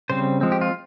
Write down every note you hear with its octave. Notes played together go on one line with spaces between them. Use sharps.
C#3 G3 C4 C5
F3 G#3 C4
G4
F4